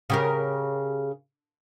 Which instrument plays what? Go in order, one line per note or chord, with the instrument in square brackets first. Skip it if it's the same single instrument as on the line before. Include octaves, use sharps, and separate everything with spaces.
[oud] C#3 G4 A#4